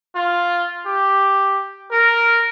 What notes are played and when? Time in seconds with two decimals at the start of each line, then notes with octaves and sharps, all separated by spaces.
0.15 F4
0.86 G4
1.91 A#4